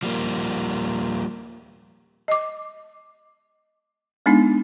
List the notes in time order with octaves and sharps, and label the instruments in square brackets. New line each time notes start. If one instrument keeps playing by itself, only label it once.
[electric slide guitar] F3 G3 A#3
[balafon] D#5 D6
G#3 B3 D4 D#4